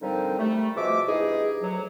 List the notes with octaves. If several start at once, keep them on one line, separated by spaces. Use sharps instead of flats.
A#2 D3 F3 G3 C4 D#4
G3 A3
B2 F3 G#3 E5 D6
G2 E3 D#4 G#4
D2 F#3